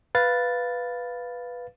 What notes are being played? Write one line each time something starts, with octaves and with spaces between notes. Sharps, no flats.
B4 F5 A6